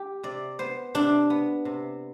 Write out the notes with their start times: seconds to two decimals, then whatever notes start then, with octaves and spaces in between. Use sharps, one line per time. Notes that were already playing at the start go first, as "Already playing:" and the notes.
Already playing: G4
0.23 C3 D5
0.59 B3 C5
0.95 C3 D4
1.30 B3
1.65 C3